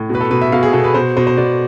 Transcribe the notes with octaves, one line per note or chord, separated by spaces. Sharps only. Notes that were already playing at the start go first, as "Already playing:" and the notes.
Already playing: A2
B2
B4
A4
B2 B4
E5
B2 F5
G#4
B2 A4
B4
B2 C5
B2 C5
C5
B2 D5